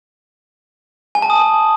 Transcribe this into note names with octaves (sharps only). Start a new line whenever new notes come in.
G#5
A5
D#6